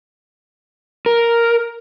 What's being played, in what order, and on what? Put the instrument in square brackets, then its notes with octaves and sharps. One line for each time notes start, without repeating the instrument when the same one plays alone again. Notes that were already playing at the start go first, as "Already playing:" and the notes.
[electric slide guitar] A#4